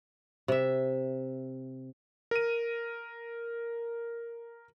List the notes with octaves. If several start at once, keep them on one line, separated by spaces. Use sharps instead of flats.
C3 E5
A#4 D#7